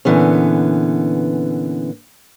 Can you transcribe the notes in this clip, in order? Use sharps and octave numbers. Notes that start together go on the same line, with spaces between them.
A#2 D3 E3 B3 C#4